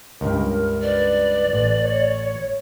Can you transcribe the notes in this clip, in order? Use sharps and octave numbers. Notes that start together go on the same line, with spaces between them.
C#2 G2 A#4
B4 D5
A1
C#5